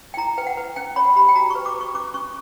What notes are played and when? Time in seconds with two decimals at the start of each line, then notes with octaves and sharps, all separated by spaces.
0.14 G5
0.17 E4 A#5
0.38 B4 G5
0.47 F#5
0.57 B4
0.76 C#4 G5
0.96 C#5 B5
1.16 G4 B5
1.29 G5
1.35 F#4 A#5
1.50 B4 C#6
1.66 D6
1.76 B4 C#6
1.94 C#4 D6
2.14 C#4 C#6